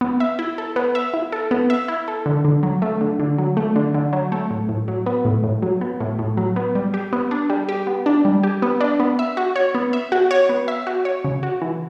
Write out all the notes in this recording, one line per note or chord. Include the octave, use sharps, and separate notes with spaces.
B3
E5
E4
A4
B3
E5
E4
A4
B3
E5
E4
A4
D3
D3
F#3
A3
D3
D3
F#3
A3
D3
D3
F#3
A3
A2
A2
F#3
B3
A2
A2
F#3
B3
A2
A2
F#3
B3
G3
G4
B3
D4
G3
G4
B3
D4
G3
G4
B3
D4
B3
E5
F#4
C#5
B3
E5
F#4
C#5
B3
E5
F#4
C#5
C#3
F#4
E3